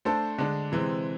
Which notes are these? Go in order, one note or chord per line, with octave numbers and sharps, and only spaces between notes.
A3 D4 A4 C5
D3 G#3 D4
C3 E3 G#3 C4